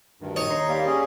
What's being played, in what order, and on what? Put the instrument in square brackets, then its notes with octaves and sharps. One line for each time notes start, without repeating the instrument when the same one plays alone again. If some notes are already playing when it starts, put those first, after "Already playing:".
[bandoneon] D2 G2 D#3
[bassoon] D#4 [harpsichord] C#5
[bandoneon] D#2 A#5 C6
[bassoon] G3 [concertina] A#3
[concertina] C#4 G#4 [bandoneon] G4 D#5